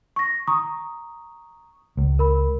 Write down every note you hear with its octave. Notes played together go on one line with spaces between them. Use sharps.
C#6 A#6
A#5 C#6 D#6
C#2
A#4 B5